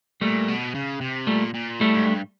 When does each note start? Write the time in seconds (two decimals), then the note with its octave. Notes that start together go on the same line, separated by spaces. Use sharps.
0.21 A#2 G3 A3
0.48 B2
0.75 C#3
1.01 C3
1.27 A#2 G3 A3
1.54 A#2
1.81 A2 G3 A3
1.94 G#2
2.07 G2